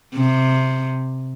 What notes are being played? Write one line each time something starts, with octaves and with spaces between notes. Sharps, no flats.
C3